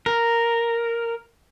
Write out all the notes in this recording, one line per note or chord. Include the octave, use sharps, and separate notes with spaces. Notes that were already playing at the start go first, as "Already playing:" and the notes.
A#4